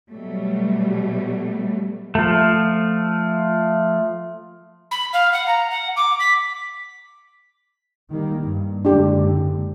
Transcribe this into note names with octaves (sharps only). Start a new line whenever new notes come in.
B2 F#3 G3 A3
F3 A3
B5
F5
F#5
A#5
F#5
D6
B6
D#3 G3 A#3
G2
F#1 G#2 D3 D4 G4